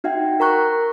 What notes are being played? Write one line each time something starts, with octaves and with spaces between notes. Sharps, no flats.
D#4 F#4 E5 F#5 G5
A#4 A#5 C#6 F#6